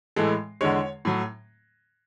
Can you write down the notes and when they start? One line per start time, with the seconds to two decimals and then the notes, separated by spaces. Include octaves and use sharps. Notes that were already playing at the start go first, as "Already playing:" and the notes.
0.16 A2 E3 G#3 A4
0.61 E2 D3 G#3 C#5
1.05 A2 F#3